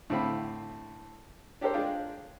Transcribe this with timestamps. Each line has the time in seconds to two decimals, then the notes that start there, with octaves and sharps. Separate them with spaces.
0.10 A2 D3 C4 E4 F5 B5
1.61 D4 G4 A4 A#4 C5
1.74 G#3 D4 F4 G5